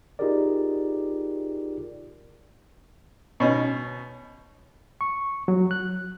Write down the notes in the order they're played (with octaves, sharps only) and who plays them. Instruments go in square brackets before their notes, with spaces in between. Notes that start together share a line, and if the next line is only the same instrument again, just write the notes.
[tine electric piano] D#4 F4 G4 G#4 A#4 D5
[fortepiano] B2 C#4 D#4
[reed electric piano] C#6
F#3
F#6